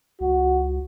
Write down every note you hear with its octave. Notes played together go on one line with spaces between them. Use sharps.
C#2 F#4